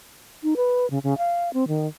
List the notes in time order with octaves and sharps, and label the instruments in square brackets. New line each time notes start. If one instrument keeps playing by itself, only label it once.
[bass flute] D#4
B4
C#3
C#3
F5
C4
D#3